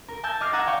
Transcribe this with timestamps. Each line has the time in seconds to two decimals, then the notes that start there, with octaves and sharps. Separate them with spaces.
0.08 A#4
0.23 G#5 A5 E6 G6 G#6
0.41 D#5 D6 F6 A6 C7
0.53 F#5 A#5 D#6 E6 F#6 G#6
0.66 D5 F5 G5 C#6